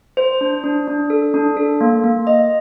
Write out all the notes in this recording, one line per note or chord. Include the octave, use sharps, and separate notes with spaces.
C5
D4
D4
D4
A4
D4
A4
A#3
A#3
D#5